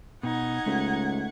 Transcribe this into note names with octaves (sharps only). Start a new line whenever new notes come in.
B2 D#4 F#5 G#6
C#2 A3